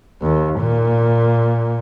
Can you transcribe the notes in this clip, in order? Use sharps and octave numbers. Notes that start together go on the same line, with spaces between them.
D#2
A#2